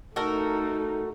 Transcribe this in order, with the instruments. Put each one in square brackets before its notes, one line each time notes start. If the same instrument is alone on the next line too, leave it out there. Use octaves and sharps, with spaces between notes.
[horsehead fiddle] A3 D#4 [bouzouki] F#4 A4 A#4